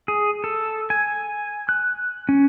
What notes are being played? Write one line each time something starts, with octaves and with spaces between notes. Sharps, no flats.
G#4
A4
G#5
F#6
C#4